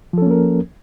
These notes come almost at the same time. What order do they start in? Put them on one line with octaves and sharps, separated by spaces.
F3 A4 C#4 A#3 A#4